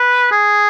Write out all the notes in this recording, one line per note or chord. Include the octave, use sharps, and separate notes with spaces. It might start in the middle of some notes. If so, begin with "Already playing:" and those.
Already playing: B4
G#4